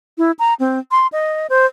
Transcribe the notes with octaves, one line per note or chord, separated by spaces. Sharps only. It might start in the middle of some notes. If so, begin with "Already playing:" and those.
E4
A#5
C4
C6
D#5
C5